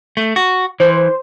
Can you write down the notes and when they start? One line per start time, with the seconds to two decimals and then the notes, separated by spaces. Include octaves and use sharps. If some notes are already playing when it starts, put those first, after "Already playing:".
0.17 A3
0.36 F#4
0.80 E3 C5